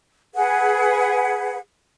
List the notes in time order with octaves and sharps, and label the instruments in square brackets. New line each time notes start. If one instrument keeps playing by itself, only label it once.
[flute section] G#4 B4 F#5